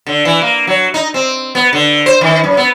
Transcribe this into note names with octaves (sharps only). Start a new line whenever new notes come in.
D3
E3
A#3
F#3
D#4
C4
B3
D3
C5
D#3
F#2
B3